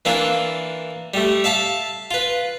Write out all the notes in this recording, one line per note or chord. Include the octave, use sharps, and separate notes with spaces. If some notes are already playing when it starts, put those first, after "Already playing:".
E3 A#3 D4 E4 F4
G3 A3
E5 F5 A5
F4 B4